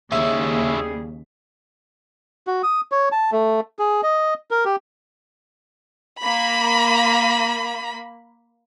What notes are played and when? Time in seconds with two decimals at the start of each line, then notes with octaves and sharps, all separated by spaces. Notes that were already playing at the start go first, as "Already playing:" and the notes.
0.12 D#2 C#3 G3 C#4 E4 G#4 E5
2.47 F#4
2.63 D#6
2.92 C#5
3.12 A5
3.32 A3
3.79 G#4
4.03 D#5
4.51 A#4
4.65 G4
6.20 A#3 B5